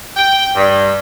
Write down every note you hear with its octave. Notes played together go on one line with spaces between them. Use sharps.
G5
G2